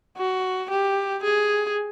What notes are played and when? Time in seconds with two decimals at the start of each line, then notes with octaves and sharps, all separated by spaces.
0.17 F#4
0.71 G4
1.23 G#4